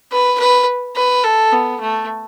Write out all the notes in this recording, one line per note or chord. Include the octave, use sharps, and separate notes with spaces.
B4
B4
B4
A4
B3
A3